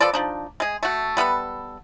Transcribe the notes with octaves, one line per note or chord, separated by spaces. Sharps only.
F3 A4 B4 D5
F3 D4 D#4
G#3 G#4
A3 F#4
G3 B3 A4 B4